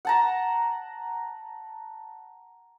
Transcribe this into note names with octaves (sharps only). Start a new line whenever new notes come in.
F#5 A5 A#5